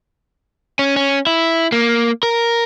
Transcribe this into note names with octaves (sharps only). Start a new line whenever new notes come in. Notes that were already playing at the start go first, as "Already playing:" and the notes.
C#4
C#4
E4
A#3
A#4